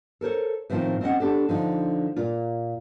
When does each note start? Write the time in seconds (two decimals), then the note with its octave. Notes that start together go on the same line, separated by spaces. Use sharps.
0.21 A4 A#4 C5 C#5
0.70 A2 D3 D#3 F3 C4 F4
1.01 C4 C#4 D#5 F#5
1.20 D4 G4 A4
1.49 D3 F3 D#4
2.16 A#2 F4